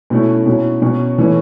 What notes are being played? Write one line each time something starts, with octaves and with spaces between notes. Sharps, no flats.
B2 A3 C#4 E4
B2 F#3 C#4 E4
B2 F#3 C#4
E3 A3 C#4 E4